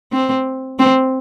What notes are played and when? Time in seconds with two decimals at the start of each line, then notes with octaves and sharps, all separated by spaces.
0.12 C4
0.79 C4